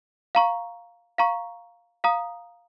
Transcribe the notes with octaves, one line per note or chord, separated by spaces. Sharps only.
F5 A#5 C#6
F5 A#5 C#6
F5 A#5 D#6